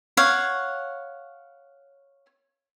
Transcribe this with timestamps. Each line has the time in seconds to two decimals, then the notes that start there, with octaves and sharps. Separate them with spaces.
0.17 C#5 F5 F#5